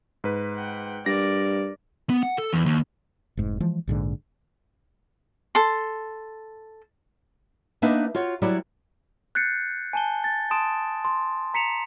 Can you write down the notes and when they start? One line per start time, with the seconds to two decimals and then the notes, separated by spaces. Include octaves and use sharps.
0.24 G#2 B4
0.56 F#5 G5
1.06 G2 A#4 D5 A#6
2.10 B3
2.23 F#5
2.38 A4
2.53 E2
2.66 D#2
3.37 F1 G#2
3.60 E3 F3 G#3
3.87 A#1 G#2 D3
5.55 A4 C6
7.82 A#3 B3 D4 D#4 B4 E5
8.15 F4 F#4 C#5
8.42 F#3 G3 E4 B4 C#5 D5
9.35 F#6 G6 A6 C7 C#7
9.93 G#5 A5 G7
10.24 A6
10.51 A5 C6 D#6 D7 E7
11.05 C6
11.54 A#5 B6 C#7 E7 F7